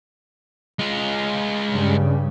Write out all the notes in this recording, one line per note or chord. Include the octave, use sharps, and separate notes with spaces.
G#3 F4
G2 C#3 G3